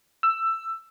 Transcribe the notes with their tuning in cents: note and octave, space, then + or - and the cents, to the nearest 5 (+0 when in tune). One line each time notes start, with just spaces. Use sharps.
E6 +15